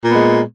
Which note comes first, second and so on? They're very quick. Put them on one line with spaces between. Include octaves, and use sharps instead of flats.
A#2 B3 G#3